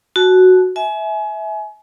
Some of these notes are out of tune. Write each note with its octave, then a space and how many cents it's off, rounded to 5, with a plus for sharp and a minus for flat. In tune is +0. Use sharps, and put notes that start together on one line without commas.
F#4 +0 A5 -30
E5 -15 G#5 +30